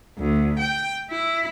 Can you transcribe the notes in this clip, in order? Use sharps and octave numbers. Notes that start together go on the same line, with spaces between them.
D2
G5
E4